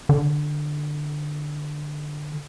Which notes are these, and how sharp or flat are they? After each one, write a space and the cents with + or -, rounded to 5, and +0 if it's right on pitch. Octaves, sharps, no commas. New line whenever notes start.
D3 +15